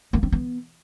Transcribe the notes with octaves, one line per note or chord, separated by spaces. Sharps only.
A#3
C4
B3